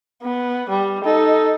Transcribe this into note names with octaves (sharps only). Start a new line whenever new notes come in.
B3
G3
D#4 A4